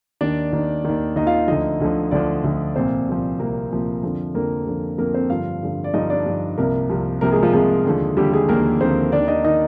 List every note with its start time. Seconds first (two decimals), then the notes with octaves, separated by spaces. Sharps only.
0.21 D#2 D#3 D4 D5
0.53 D#2 D#3
0.85 D#2 D#3
1.16 D#2 D#3 D#4 D#5
1.27 F4 F5
1.48 D2 D3 F3 D#4 D#5
1.80 D2 D3 F3
2.11 D2 D3 F3 D4 D5
2.44 D2 D3 F3
2.76 C2 A#2 F3 C4 C5
3.07 C2 A#2 F3
3.39 C2 A#2 F3 A#3 A#4
3.71 C2 A#2 F3
4.03 F2 D3 F3
4.34 F2 D3 F3 A#3 A#4
4.66 F2 D3 F3
4.98 F2 D3 F3 A#3 A#4
5.14 C4 C5
5.30 G2 D3 F3 F4 F5
5.63 G2 D3 F3
5.84 D5
5.94 G2 D3 F3 D#4 D#5
6.10 D4 D5
6.26 G2 D3 F3
6.58 C2 C3 F3 A#3 A#4
6.90 C2 C3 F3
7.21 C2 C3 F3 A#3 A#4
7.32 G#3 G#4
7.43 F3 F4
7.53 C2 C3 F3 G#3 G#4
7.85 D#2 D3 F3
8.17 D#2 D3 F3 G3 G4
8.33 G#3 G#4
8.49 D#2 D3 F3 A#3 A#4
8.80 D#2 D3 F3 C4 C5
9.12 D#2 D#3 D4 D5
9.28 D#4 D#5
9.44 D#3 D#4 D#5